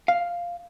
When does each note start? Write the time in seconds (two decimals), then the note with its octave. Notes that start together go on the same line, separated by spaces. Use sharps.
0.08 F5